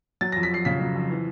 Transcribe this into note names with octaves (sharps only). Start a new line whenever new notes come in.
F#3 A6
F2 A#6
B6
F2 C7
C#3 B6
F#3
F2
E3